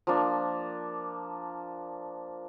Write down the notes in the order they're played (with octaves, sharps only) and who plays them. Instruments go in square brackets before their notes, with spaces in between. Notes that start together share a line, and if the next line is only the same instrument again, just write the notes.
[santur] F3 A#3 D4